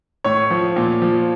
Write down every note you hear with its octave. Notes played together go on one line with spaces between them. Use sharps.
A2 C#5 C#6
F3
A#2
F3